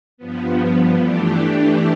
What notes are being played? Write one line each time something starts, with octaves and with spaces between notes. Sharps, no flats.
G2 F3 B3
E3 A3 D4 G4